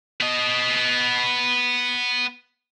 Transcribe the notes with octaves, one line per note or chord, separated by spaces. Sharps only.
B3 D#5